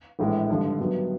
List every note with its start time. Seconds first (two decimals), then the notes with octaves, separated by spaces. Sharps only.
0.19 A#1 A2 E3 G#3
0.49 G#1 G2 D3 F3
0.79 G2 D#3 F#3 B3